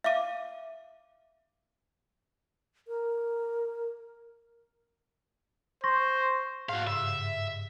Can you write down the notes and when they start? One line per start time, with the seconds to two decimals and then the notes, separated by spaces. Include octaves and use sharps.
0.04 E5 F5 D6 D#7
2.88 A#4
5.84 C5 C6 C#6 A#6
6.69 G#2 F#4 F5
6.87 G2 C#3 E5